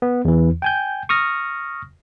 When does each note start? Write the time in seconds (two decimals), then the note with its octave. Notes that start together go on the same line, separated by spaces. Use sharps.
0.02 B3
0.25 E2 E3
0.62 G5 G#5 G6
1.09 C#6 D#6 F6 A#6